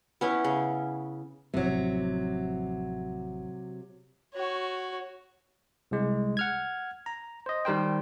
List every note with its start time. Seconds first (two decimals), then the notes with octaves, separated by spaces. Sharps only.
0.21 B3 C#4 E4
0.44 C#3
1.54 A1 C3 F3 F#3
4.34 F#4 C#5
5.91 C2 G#3
6.37 F#5 F6 G#6
7.06 A#5
7.46 C5 D#5
7.65 D#3 G3 A#4 C5 G5